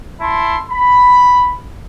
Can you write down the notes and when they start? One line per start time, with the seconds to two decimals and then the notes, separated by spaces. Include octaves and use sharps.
0.21 E4 A5 C6
0.71 B5